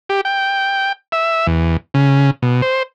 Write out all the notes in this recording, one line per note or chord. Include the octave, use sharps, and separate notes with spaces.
G4
G5
E5
E2
C#3
B2
C5